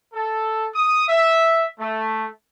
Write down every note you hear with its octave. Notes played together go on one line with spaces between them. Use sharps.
A4
D#6
E5
A3